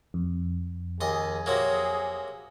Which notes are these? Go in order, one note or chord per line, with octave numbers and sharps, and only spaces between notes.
F2
D#2 G#4 D#5
C3 F#3 A#3